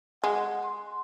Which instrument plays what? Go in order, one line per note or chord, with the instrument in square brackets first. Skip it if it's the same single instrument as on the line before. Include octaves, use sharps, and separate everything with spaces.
[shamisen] G#3 [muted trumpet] F#5
[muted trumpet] C6